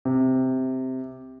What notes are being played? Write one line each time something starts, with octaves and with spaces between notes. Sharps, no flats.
C3